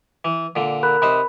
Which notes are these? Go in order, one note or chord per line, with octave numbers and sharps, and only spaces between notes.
E3
A#2 D3
A#4 B5 F#6
C3 D#4 C5 B5